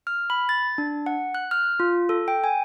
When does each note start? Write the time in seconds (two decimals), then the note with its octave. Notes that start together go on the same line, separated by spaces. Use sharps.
0.07 F6
0.30 B5
0.49 A6
0.78 D4
1.06 F#5
1.35 F#6
1.51 F6
1.80 F4
2.09 A4
2.28 G5
2.44 G#5